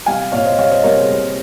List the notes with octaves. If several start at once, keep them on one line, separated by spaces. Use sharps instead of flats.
C2 F5 G#5
A#2 C#5 F5
C5 D#5
C2 C#5 F5
C5 D#5
C2 A#4 C#5
G#4 C5
C2